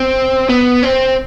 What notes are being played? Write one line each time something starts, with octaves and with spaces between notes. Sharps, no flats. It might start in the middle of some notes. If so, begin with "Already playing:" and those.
Already playing: C4
B3
C4